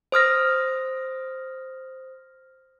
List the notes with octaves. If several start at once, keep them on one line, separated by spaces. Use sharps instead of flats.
C5 D#6 F6 A#6